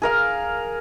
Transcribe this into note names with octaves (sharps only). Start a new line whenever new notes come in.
G#4 A#4 F5